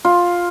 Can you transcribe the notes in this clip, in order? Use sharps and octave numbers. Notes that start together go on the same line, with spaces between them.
F4